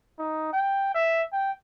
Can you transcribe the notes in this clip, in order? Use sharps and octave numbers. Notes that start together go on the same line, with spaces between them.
D#4
G5
E5
G5